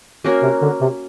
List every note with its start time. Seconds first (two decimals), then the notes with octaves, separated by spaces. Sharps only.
0.24 A#3 C#4 F#4 A#4
0.43 C3
0.62 D3
0.81 C3